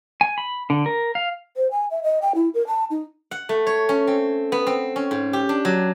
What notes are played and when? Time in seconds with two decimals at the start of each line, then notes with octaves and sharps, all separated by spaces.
0.21 G#5
0.38 B5
0.70 D3
0.86 A#4
1.15 F5
1.56 C5
1.71 G#5
1.91 E5
2.03 D#5
2.22 G5
2.35 E4
2.54 A#4
2.67 A5
2.90 D#4
3.31 F#5
3.49 A3
3.67 C#5
3.89 C#4
4.07 C4
4.52 B3
4.67 C4
4.96 C#4
5.11 G#2
5.33 G4
5.49 D4
5.65 F#3